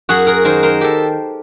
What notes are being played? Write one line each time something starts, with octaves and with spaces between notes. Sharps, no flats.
F#2 F#4 G#4
G#4 A#4
D#3 A#4 C5
A#4 C5
G4 A4